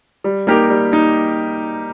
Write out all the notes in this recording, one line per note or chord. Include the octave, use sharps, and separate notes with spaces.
G3
A#3 D#4 G4 A#4
G3
A#3 D#4